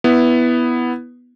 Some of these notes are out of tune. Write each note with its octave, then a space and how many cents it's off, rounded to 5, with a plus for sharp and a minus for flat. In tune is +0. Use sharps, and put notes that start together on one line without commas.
B3 +0 E4 +0